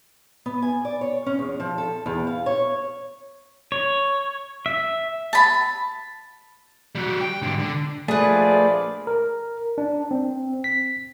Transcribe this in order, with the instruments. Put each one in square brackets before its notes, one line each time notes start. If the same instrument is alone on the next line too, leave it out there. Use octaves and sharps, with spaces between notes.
[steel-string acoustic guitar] B3
G#5
D5
C#5
C#4
E2
F3
A4
E2
F5
C#5
[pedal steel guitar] C#5
E5
[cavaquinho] A5 B5
[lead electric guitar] G3 F#4
G5
G#2 D3
D3
[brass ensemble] A#1 F3 D5 [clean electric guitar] A3 [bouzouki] G#4 B4
[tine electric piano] A#4
D4
C4
B6